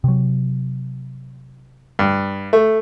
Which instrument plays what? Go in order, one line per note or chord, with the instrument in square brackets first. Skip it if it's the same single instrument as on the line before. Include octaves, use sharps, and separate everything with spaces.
[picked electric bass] C3 F#3
[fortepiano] G2
A3